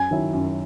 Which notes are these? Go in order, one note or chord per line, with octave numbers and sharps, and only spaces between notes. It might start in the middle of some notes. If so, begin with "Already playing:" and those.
Already playing: F#2 G#5
D#3 F#3 C#4 E4
F#2